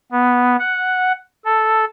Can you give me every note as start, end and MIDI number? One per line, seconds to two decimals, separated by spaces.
0.12 0.56 59
0.59 1.12 78
1.45 1.85 69